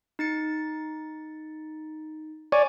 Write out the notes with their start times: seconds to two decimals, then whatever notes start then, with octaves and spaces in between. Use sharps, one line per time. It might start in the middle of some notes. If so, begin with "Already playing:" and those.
0.19 D#4 A6 C#7
2.52 C#5 D5 G#5